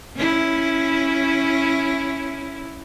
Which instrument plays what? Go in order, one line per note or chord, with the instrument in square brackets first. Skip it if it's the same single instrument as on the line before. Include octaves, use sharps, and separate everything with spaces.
[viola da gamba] C#4 E4